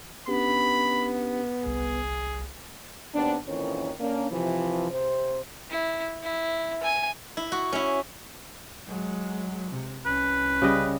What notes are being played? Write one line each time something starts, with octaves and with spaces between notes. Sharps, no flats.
B3 C#4 D4 G4 B5
G1 C2 G#4
D#2 B3 C4 D4
F2 A#2 D#3 E3 C#4 C#5
A#3 C#4 D4
C3 E3 F3
C3 C5
E4
E4
G#5
E4
F#4
C#4 E4
F#3 G#3
C3
C2 C#4 B4
C#3 G3 D#5